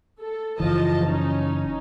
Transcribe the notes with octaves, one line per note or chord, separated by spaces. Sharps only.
A4
F#1 E3 F3 D#5 A5
C#4 D#4